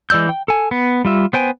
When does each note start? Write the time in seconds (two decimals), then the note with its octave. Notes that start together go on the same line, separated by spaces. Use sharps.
0.10 E3 G#3 D5 E6 G6
0.29 G5
0.48 A4 G#5
0.71 B3
1.05 G3 F4 E5
1.33 B3 C5 G5 G#5